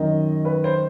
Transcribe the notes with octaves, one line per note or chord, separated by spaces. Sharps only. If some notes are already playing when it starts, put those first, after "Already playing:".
Already playing: F#2 D#3 D#5
B4
C5